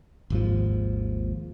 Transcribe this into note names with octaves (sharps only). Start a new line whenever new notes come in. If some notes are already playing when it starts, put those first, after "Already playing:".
G#1 D#2 G#2 F3